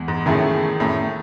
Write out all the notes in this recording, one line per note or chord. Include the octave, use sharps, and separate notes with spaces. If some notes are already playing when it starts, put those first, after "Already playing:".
Already playing: E2 E3 G#3
G#2
F#2 A2 D#3 A3 E4 G#4
F#2 A2